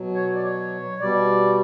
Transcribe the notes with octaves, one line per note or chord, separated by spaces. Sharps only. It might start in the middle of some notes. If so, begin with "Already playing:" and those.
Already playing: B2 F#3
C#5
D5
C#5
B2 G3 D5